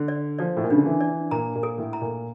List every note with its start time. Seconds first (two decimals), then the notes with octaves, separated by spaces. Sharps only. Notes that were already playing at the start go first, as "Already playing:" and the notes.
Already playing: D3
0.08 D5
0.39 F3 D5
0.57 A2
0.64 A#2
0.70 C#3 D4
0.78 D3
0.86 E3
1.01 D5
1.31 A#2 A#5
1.55 A#2
1.63 A4
1.78 A2
1.93 A#5
2.01 A#2